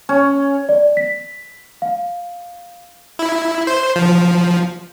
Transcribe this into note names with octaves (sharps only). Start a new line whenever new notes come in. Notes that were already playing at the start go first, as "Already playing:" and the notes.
C#4
D5
B6
F5
E4
C5
F3